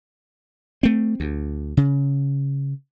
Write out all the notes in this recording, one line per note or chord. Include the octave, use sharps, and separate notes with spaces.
A3 C4
D2
C#3